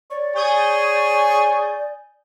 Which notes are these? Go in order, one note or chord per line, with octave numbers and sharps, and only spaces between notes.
C#5 D5
G#4 C#5 G#5 D#6 G6